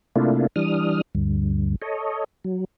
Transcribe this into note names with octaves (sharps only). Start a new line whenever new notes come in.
C3 A3 A#3 D4 E4 F4
E3 G3 D4 D#6 F6
D2 G2
A4 C#5 D#5
F#3